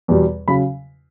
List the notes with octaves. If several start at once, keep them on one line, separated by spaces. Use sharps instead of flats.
E2 B2 G3
C#3 F#3 B5